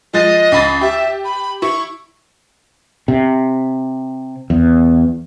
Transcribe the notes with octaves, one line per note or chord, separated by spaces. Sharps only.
F3 G#3 D#5 A6
C#2 B5 A6
G4 E5
B5
E4 C#6
C3
E2